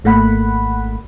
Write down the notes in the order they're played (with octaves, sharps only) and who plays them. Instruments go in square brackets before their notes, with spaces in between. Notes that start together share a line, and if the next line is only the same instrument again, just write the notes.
[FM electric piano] G#1 A3 A#3 F#5 B5